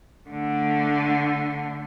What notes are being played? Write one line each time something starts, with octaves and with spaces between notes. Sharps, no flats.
D3 A3